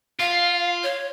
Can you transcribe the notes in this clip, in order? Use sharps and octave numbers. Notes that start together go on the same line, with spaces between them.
F4 F5
C#5